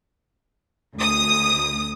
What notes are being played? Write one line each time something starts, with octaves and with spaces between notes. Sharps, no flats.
D2 D#6